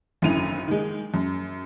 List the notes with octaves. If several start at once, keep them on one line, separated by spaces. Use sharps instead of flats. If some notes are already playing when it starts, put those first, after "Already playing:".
G#1 F#2 D3 E4 D#7 F7
D#3 G#3
F#2